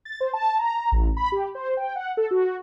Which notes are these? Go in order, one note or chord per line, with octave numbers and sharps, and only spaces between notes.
A6
C5
A5
A#5
A1
B5
G4
C5
G5
F#5
A4
F#4